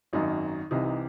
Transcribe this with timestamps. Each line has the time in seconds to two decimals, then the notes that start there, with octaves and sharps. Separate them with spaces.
0.13 G#1 F#2 D#3 F#3 D#4
0.71 C2 C3 E3 D#4
0.85 D#4